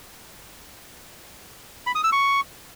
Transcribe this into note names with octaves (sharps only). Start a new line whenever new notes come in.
B5
D#6
E6
C#6